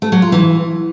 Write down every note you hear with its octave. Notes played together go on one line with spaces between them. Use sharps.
A3
F#3
F4
E3